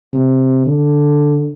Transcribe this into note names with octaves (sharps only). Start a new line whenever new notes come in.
C3
D3